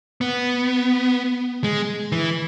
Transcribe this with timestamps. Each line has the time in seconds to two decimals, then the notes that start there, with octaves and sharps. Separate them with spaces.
0.21 B3
1.64 G#3
2.12 E3